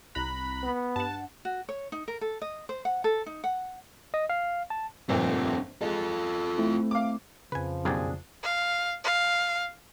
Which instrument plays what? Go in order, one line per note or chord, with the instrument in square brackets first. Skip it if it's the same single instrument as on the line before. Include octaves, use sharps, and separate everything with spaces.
[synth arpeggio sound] C2 A#5 F#6 [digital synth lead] B5
[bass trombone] B3
[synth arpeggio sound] G2 F#5 [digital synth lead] A5
[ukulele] F#4
C#5
D#4
A#4
A4
D#5
C5
F#5
A4
D#4
F#5
[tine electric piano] D#5
F5
A5
[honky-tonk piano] G1 F2 A#2 [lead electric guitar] A3 C4
[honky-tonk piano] G#3 [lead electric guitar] F4 A4
[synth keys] A3 C4 E4
[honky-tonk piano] F5 D6
[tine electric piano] F2 C#3 [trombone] F3 [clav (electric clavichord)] B4 G#5
[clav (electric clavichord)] B1 F#2 G4 [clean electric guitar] D4 G#4
[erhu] F5
F5